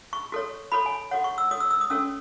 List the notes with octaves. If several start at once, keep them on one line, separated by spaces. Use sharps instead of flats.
C#6
F#4 A4 C#5
F#4 A4 C#5 B5
G#5
F#4 A4 C#5 F#5
C#6
E6
F#4 A4 C#5 D#6
E6
E6
D#6
C#4 F#4 A4 C#5 E6